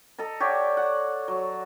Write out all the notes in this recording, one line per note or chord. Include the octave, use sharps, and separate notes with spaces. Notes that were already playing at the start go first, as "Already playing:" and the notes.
A4 D#5 A#5
G4 C#5 D5 F#5
F#5
F#3